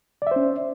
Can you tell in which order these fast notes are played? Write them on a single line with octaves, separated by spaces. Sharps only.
D5 E5 C5 C#4